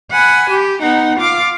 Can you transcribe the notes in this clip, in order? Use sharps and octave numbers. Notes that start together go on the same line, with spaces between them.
F#5 G#5 B5
G4
B3 D#4 F#5
F4 F5 D6